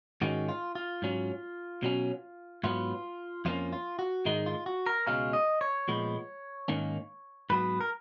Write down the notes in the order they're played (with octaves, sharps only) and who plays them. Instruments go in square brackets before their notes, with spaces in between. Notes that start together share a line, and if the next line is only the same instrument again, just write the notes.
[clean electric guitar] G#2 D#3 G#3 C#4 F#4
F4
F4
G#2 F#3 C#4
B2 F#3 C#4
G#2 F#3 B3 F4
F2 F3 A#3 C#4 F4
F4
F#4
G#2 D#3 G#3 D#4
F4
F#4
A#4
C#2 B2 G#3 C#4 F5
D#5
C#5
A#2 F3 G#3 B3
G#2 D#3 A#3 C#4
G#2 F#3 B3 B4
A#4